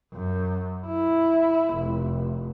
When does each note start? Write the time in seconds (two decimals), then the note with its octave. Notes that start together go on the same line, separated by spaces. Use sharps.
0.14 F#2
0.86 E4
1.75 F1